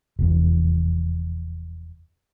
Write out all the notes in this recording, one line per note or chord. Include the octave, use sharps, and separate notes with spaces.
F1 E2